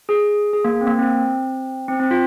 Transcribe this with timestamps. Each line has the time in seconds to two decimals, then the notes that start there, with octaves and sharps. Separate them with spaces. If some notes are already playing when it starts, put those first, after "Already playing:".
0.09 G#4
0.53 G#4
0.65 A#3
0.81 C4
0.87 A#3
0.98 C4
1.88 C4
2.00 C4
2.11 F4